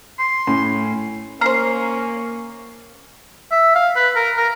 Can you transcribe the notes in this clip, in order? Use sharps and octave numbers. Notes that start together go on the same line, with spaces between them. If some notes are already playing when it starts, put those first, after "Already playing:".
C6
A2 C#4
A#3 C#4 C5 A#5 F6 C7
E5
F5
B4
A#4
A#4